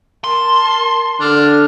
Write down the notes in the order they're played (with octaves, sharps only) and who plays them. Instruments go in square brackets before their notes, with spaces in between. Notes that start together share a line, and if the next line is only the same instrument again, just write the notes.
[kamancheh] A#4 A5 [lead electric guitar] C6
[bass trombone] D3 [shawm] D4 [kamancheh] F6